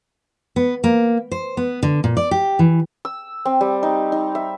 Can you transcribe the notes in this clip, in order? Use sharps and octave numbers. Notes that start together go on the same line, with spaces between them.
B3
A#3
C5
B3
D3
A#2
D5
G4
E3
E6
C4
G3
D#4
D#4
E5